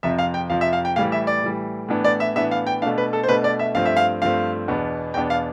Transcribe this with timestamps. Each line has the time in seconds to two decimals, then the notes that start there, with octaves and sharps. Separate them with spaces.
0.03 F2 C3 F3 E5
0.19 F5
0.34 G5
0.50 F2 C3 F3 F5
0.61 E5
0.73 F5
0.85 G5
0.96 A2 E3 G3 F5
1.12 E5
1.27 D5
1.43 A2 E3 G3
1.89 A2 E3 B3 D4
2.04 D5
2.20 E5
2.36 A2 E3 B3 D4 E5
2.51 F5
2.67 G5
2.82 B2 A3 D4 F5
2.98 B4
3.13 A4
3.23 C5
3.28 B2 A3 D4 B4
3.44 D5
3.59 E5
3.75 G2 F3 A3 C4 F5
3.86 E5
3.97 F5
4.22 G2 F3 A3 C4 F5
4.68 E2 B2 B3 D4
5.14 E2 B2 B3 D4 G5
5.30 F5